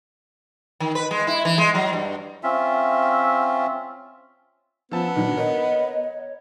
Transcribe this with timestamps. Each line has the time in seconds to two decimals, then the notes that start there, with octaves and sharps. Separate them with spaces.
0.80 D#3
0.95 B4
1.11 G#3
1.27 E4
1.45 E3
1.58 G#3
1.75 F#3
1.93 G2
2.43 C4 C#4 F4 E5
4.92 F3 B3 C#4 A5 E6
5.15 A#2 D#3 F#3 D4
5.37 A#4 C#5 D#5